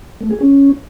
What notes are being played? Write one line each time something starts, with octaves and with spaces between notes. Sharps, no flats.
A3
G#4
C#4